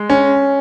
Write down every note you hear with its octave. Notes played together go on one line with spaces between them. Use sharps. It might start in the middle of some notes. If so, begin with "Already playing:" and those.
Already playing: G#3
C#4